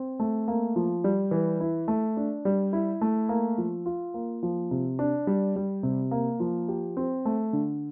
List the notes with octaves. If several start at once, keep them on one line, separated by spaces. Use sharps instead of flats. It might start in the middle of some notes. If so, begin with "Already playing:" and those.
Already playing: C4
A3
A#3
F3
G3
E3
E4
A3
D4
G3
E4
A3
A#3
F3
F4
A#3
F3
C3
D4
G3
G3
C3
A#3
F3
G4
C4
A3
D3